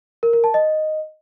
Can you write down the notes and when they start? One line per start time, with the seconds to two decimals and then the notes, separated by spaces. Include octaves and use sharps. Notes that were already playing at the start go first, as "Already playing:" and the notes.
0.23 A#4
0.33 A#4
0.44 A5
0.54 D#5